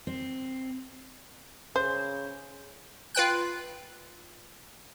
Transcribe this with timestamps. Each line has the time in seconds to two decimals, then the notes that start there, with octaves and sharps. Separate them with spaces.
0.07 C4
1.76 C#3 C5 G6
3.15 F4 B4 G5 F#6